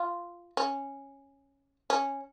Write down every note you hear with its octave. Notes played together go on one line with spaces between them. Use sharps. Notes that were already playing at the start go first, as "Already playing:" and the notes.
Already playing: F4
C#4
C#4